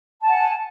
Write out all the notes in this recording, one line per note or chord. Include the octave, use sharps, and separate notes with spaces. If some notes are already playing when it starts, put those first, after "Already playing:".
F#5 G#5 A5